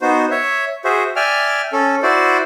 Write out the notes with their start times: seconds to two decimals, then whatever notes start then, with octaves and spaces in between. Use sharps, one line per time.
0.01 B3 D#4 F#4 C5
0.31 C#5 E5
0.85 F#4 G#4 C5 E5
1.16 D5 E5 G5 G#5 F6
1.73 C#4 A4
2.03 E4 F#4 C5 D5